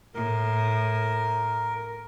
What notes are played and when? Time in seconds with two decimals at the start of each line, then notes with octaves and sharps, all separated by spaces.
0.15 A2 A#4